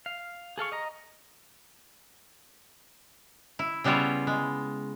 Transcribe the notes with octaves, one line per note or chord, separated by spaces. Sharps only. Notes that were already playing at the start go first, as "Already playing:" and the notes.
F5
G#4 A4 F5 C#6
D#5 A#5
E4
C#3 G3 B3 E4 F4 C#5
G#3